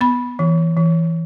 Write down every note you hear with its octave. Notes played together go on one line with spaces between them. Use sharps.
B3 B5
E3
E3